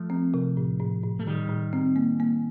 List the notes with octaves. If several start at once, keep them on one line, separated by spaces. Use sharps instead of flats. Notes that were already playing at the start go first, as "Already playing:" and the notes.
Already playing: F3 A3
C4
C3
A2
A2
A2
A3
A2 D#3 G3
A2
C4
A#3
A#3